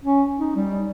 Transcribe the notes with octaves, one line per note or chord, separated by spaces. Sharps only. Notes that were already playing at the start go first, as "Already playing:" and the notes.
C#4
D#4
G3